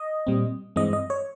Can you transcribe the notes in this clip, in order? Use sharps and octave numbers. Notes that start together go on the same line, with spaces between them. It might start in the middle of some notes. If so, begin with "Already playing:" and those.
Already playing: D#5
A#2 G3 C4
G2 E3 G#3 C4 D#5
D#5
C#5